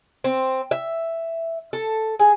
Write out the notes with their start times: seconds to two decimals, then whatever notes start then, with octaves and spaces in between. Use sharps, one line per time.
0.24 C4
0.71 E5
1.73 A4
2.19 G#4